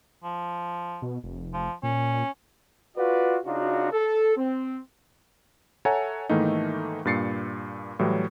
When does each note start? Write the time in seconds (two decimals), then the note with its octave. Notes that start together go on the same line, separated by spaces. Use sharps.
0.24 F3
1.02 B2
1.24 F1
1.54 F3
1.83 A#2 C#4
2.97 F4 F#4 B4 D5
3.44 C#3 D4 D#4 F4 F#4
3.91 A4
4.37 C4
5.85 A4 C#5 E5 F#5 G#5 A#5
6.29 G#2 D#3 E3 A3 A#3 D#4
7.05 G2 A#2 A6 C7 C#7
7.99 A2 E3 F#3 G3